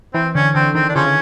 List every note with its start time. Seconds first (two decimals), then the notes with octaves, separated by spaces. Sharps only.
0.14 E3 C4
0.34 D3 C#4
0.55 D3 C4
0.75 D#3 C4
0.89 D4
0.95 C#3 F3 C#4
1.06 C#3